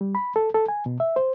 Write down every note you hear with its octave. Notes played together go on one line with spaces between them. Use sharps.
G3
B5
A4
A4
G#5
B2
E5
C5